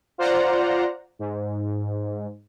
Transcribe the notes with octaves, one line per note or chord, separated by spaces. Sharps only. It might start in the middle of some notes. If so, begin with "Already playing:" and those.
F4 C5 D5 F#5 A#5
G#2